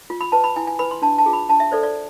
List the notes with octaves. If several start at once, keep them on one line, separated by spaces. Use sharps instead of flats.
F4
B5
B4 A5
B5
E4 G#5
G#5
B4 B5
C6
D4 A5
A5
F4 G#4
B5
D4 A5
E5
A4 C5 D5
D5